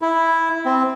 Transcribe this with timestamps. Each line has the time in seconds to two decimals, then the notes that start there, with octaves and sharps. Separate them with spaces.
0.02 E4
0.65 C4